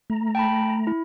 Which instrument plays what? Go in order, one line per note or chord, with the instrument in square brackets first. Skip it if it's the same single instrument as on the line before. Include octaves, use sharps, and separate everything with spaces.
[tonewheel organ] A3 A#5
[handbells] G5 A5 B5
E4